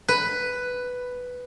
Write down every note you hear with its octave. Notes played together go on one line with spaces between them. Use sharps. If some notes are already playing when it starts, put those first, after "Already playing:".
B4